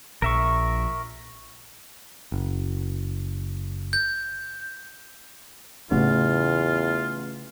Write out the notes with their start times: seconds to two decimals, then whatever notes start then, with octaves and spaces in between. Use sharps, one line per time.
0.22 A#1 A#4 E5 C#6
2.32 F#1
3.93 G6
5.91 A1 E2 C#3 A3 F4